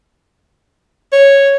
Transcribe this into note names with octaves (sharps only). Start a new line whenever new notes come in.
C#5